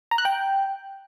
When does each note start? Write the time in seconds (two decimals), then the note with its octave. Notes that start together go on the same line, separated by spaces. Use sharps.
0.11 A#5
0.18 F#6
0.25 G5